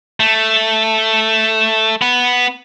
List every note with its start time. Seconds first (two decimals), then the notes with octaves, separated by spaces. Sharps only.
0.20 A3
2.02 B3